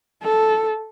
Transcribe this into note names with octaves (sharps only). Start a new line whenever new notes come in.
A4